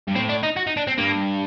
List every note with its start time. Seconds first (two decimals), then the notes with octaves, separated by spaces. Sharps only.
0.08 G2
0.15 A2 C4
0.29 D4
0.43 D#4
0.56 F#4
0.67 D#4
0.77 D4
0.87 C4
0.97 G2 A#3